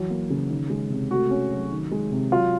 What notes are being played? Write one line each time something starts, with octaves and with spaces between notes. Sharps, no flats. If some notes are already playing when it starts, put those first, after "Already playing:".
Already playing: E3 F#3
A#3
C#3
D#3
G#3
C3
A3 F#4
C#4
F#3
D#3
G#3
C3
F#3 F4